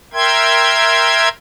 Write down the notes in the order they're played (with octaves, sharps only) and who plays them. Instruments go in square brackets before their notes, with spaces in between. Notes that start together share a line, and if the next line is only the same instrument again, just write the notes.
[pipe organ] A#4 E5 G5 C6 G#6